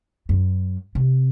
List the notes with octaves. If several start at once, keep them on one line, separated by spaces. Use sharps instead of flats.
F#2
C3